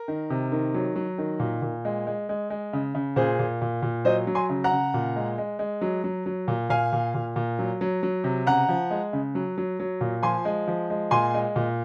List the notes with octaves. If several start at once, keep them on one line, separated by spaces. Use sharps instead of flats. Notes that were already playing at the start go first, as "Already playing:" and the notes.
Already playing: A#4
D#3
C3
D#3
F#3
F#3
D#3
A#2
A#2
G#3
G#3
G#3
G#3
C#3
C#3
A#2 G#4 C5
A#2
A#2
A#2
F#3 C5 D#5
F#3
G#5 C6
C#3
F#5 A#5
C#3
A#2
G#3
G#3
G#3
F#3
F#3
F#3
A#2
A#2 F5 G#5
A#2
A#2
A#2
F#3
F#3
F#3
C3
C#3 F#5 A#5
F3
G#3
C#3
F#3
F#3
F#3
A#2
F3 G#5 C6
G#3
F3
G#3
A#2 G#5 C6
G#3
A#2